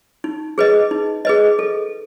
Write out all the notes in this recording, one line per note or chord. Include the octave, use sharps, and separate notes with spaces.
D#4
G#4 B4 D#5
D#4
G#4 B4 D#5
A4